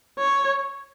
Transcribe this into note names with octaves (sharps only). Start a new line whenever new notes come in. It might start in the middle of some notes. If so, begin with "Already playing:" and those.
C#5